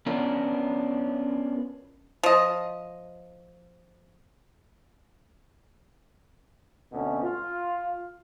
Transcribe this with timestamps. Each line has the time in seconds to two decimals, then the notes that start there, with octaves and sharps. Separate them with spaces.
0.06 B3 C#4 D4 F4 A#4
2.23 F3 D#5
6.92 D2 B2 C4 C#4
7.22 F4